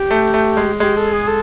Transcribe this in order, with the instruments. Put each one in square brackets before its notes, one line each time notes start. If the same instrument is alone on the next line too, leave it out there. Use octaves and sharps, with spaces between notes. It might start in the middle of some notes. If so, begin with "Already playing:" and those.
Already playing: [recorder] G4
[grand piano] A3
A3
G#3
[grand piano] G#3 [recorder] G4
[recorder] A4
G#4
A4